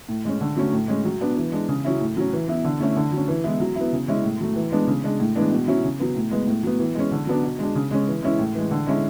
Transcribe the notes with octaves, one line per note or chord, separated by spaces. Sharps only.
A2
G#3 C#4
D3
F#3 A3 C#4
A2
G#3 C#4
F#3
B3 D4
E3
G#3 D4
C#3
F#3 C#4 E4
A2
F#3 C#4
E3
B3 E4
D3
A3 C#4 E4
D3
F#3
C#4
E3
G#3 B3 E4
F#3
E4
B3
C#3
G#3 C#4 E4
A2
F#3 A3
E3
G#3 B3 D4
C#3
G#3 D4
A2
E3 G#3 B3 D4
B2
F#3 C#4 E4
C#3
F#3 B3
A2
G#3 B3
A2
F#3 B3
E3
G#3 C#4
D3
F#3 B3 D4
B2
G#3 D4
C#3
G#3 C#4
E3
G#3 C#4 E4
A2
E3 G#3
D3
G#3 C#4 E4